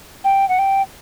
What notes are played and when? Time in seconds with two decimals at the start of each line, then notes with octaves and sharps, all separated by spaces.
0.24 G5
0.49 F#5
0.59 G5